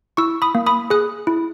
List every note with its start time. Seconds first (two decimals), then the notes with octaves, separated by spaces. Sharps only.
0.17 E4 C#6 E6
0.42 B5 D#6
0.55 A#3
0.66 B5 D#6
0.90 G#4 D#6 F#6
1.27 E4